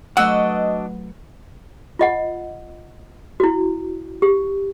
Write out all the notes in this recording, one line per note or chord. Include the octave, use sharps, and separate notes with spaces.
F#3 A3 D4 F#4 B4 D#5 F#5 E6
F4 D#5 F#5
E4 F#4
G4